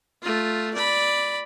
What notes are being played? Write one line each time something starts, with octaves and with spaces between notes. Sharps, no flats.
A3 F4
D5 B5